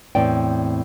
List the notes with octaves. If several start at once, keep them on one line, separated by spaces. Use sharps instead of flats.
E2 A2 C4 D5 G5